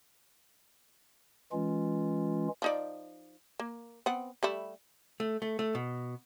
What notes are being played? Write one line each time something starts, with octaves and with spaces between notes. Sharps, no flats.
E3 G#3 C#4 F4
F3 D#4 D5
A#3
B3 C4 F#5
G3 A3 E4
A3
A3
A3
B2